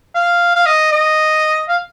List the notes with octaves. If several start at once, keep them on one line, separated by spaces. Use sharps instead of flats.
F5
F5
D#5
D#5
F5